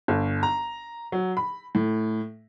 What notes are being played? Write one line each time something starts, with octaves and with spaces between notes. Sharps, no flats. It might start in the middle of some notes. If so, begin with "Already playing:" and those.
G1
A#5
F#3
B5
A2